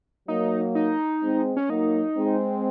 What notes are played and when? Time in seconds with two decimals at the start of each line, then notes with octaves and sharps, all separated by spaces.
0.28 F#3 A#3 D#4
0.75 D#4
1.23 G#3 C4
1.57 C#4
1.69 F#3 A#3 D#4
2.17 G#3 C4